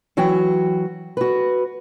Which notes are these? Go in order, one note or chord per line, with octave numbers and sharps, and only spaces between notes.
E3 F#3 F#4 G5
F#4 B4